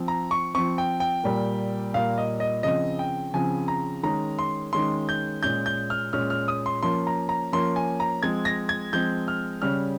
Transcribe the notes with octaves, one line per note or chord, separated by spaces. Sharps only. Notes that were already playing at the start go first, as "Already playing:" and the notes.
Already playing: F3 C4
A#5
C#6
F3 C4 C#6
G5
G5
A#2 G3 A#3
A#2 G3 A#3 F5
D#5
D#5
C#3 F3 C4 D#5
G5
C#3 F3 C4 G#5
A#5
D#3 G#3 C#4 A#5
C6
D#3 G#3 C#4 C6
G6
A#2 G#3 C#4 G6
G6
F6
A#2 G#3 C#4 F6
F6
D#6
C6
F3 A#3 C#4 C6
A#5
A#5
F3 A#3 C#4 C6
G#5
A#5
F3 G#3 C4 G#6
A#6
G#6
F3 G#3 C4 G6
F6
C#3 G3 C#4 F6